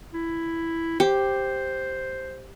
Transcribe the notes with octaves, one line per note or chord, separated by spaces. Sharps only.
E4
G4 C5